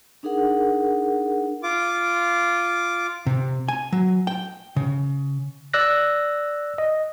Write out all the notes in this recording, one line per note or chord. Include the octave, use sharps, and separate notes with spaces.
D4 D#4 G#4 A#4 F#5
F4 D6
C3
G#5
F#3
G5
C#3
D5 E6 F#6 A#6
D#5